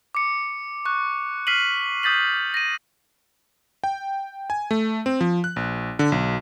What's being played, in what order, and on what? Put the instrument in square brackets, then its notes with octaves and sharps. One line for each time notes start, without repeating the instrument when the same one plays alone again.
[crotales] D6 C#7
C#6 F#6
F6 B6 C7 D#7 F#7
D#6 G6 A6 B6 F#7
A#6 D#7
[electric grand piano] G5
G#5
A3
C4
F3
F#6
A#1
D3
B1